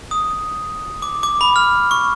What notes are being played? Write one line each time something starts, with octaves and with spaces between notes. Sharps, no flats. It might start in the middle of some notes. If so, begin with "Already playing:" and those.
D#6
D6
D6
B5
F6
C#6